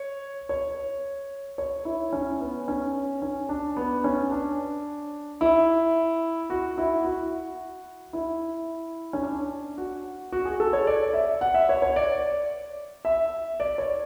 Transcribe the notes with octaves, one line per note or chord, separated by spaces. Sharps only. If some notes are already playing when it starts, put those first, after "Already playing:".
Already playing: C#5
C#5
C#5
E4
C#4
B3
C#4
C#4
D4
B3
C#4
D4
E4
F#4
E4
F#4
E4
C#4
D4
F#4
F#4
G#4
A4
C#5
D5
E5
F#5
E5
C#5
C#5
D5
E5
D5
C#5